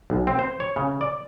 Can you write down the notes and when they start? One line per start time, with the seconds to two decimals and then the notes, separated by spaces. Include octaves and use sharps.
0.10 B1
0.27 C4
0.39 C5
0.60 C#5
0.76 C#3
1.01 D5